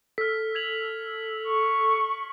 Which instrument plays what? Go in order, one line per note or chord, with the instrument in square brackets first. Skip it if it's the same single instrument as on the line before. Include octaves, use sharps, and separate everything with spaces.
[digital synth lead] A4 [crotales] F6 B6
[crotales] G#6 F7 F#7
[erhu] C#6